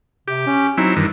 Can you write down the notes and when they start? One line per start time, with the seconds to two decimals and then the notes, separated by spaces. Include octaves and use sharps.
0.28 C3 G4
0.46 C#4
0.78 F#3 C4 D#4 E4
0.97 G2 D#3 E3